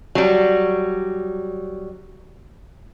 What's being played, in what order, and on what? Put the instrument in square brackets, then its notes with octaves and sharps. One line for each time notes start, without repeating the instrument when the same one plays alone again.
[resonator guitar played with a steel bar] F#3 G3